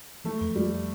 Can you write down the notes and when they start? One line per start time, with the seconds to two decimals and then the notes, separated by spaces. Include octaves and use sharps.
0.24 E3 A3
0.41 F2
0.56 F2 G3